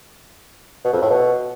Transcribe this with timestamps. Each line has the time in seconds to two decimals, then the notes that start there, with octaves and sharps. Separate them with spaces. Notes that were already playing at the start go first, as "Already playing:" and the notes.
0.85 B2
0.93 F2
1.02 A2
1.10 B2